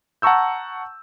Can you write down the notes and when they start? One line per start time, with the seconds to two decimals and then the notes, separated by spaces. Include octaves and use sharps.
0.22 F#5 A5 A#5 C#6 E6 G6